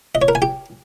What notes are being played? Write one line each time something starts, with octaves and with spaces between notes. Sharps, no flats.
D#5
C#5
A#4
G#5
G4